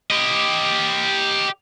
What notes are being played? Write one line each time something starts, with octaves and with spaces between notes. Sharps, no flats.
G4 D#5